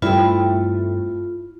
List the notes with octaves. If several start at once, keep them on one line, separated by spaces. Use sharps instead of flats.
G2 A3 C4 E4 F4